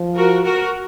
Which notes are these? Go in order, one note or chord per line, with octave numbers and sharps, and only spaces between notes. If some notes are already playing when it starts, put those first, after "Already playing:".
Already playing: F3
F#4 A#4
F#4 A#4